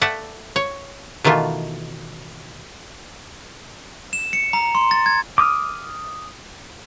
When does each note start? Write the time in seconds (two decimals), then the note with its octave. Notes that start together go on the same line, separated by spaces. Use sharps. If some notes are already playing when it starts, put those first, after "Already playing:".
0.01 A3 D5 E5 F#5
0.56 C#5
1.24 B2 D#3 E3 A3 F4
4.13 E7
4.33 C#7
4.53 A#5
4.75 C6
4.91 A6
5.06 G#6
5.38 D6 D#6 F6